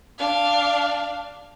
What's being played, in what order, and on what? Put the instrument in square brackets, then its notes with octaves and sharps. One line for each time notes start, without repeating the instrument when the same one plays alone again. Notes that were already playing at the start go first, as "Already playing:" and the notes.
[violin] D4 F5